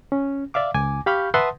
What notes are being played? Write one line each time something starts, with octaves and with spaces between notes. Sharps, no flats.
C#4
D5 E5 F5 D6
C#2 G#5 D6
G4 F5 B5 C#6 F6 G6
B4 E5 F#5 A5 C6 D#6